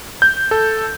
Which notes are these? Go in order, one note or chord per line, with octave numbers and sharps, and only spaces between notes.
G6
A4